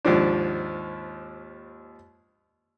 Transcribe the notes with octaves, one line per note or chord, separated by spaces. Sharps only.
D#2 G#2 F3 D4